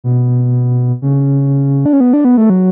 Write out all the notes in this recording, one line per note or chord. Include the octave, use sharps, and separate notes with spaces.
B2
C#3
D4
C#4
B3
D4
B3
A3
F#3